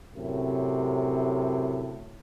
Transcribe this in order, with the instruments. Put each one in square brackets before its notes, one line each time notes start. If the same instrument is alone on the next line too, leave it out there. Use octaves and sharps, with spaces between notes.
[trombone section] F#2 A2 C3